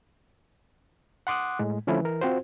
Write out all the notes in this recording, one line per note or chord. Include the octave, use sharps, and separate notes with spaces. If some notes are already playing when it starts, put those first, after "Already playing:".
F#5 C6 D6 D#6 F#6
A2 G#3
D3 F3 A3 C#4 E4
E3 A#4
C4 F4 F#4 C5